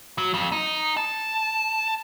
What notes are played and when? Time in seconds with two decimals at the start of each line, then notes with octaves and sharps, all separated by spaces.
0.18 F#3
0.34 F2
0.52 D#4
0.97 A5